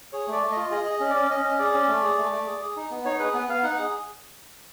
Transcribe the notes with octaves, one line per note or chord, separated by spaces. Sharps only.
G#4 C#5
A3 D5
A3
F4 D#5
G#4 D#5
G#4
D#5
C#4
D5
C#4
C#4 D#5
C#4
G#4 D5
C#4
A3
G#4
A3
A3
G#4
G#4
D#4
B3
D#4 C#5
G#4 B4
B3 B4
B3 F5
D#4 F#5
G#4